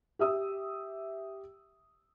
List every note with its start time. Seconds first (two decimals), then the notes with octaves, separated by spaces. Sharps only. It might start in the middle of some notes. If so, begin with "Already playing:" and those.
0.19 G4 E5 D#6 E6